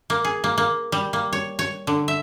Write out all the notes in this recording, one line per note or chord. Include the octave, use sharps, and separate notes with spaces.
A#3
G#4
A#3
A#3
G3
A#3
C#5
C#5
D3
E5